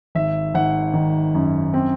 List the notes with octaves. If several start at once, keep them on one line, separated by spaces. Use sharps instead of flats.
G#1 E5
G#1 F#5
D#3
F#2
C4